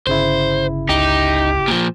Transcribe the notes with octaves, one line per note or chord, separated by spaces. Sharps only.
G1 C#3 E4 C5
C#2 D#4 G4
A#2 F3